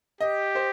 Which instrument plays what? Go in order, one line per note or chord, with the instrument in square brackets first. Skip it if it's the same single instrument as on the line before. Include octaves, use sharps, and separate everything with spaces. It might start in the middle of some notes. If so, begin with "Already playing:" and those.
[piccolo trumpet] G4 [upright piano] D#5
[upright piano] C5